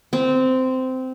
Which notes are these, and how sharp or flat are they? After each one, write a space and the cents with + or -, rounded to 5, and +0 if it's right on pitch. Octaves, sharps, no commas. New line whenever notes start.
C4 -15